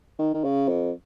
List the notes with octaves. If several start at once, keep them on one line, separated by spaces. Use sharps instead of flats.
D#3
D#3
C#3
F2